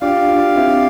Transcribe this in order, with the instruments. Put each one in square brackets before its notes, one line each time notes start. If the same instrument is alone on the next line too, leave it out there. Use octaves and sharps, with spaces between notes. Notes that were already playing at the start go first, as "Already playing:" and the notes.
[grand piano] D4 F4 [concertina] G4 D5 F5
[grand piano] D4 F4
C4 E4